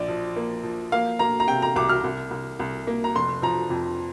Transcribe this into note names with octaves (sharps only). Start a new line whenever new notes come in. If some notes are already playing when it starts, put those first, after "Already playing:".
Already playing: A#1 D5
F3
A#3
F3
A#3 F5
A#3 A#5
A#5
C3 G5
A#5
C2 D6
F6
C2
C2
C2
A#3
A#5
F1 C6
F3 A#5
F2